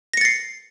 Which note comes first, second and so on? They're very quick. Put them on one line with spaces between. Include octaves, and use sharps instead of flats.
A#6 C#7 A6 C7